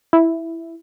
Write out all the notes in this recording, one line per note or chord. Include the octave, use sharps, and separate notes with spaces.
E4